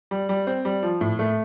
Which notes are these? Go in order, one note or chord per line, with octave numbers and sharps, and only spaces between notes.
G3
G3
C4
G3
F3
A2
A3